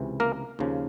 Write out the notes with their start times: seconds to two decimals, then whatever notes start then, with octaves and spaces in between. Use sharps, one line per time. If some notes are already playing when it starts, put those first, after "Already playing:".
Already playing: C#2 C3 E3
0.20 A#3 A#4
0.59 D#2 C#3 F3